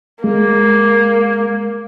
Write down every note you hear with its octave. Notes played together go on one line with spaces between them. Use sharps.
G#3 A#3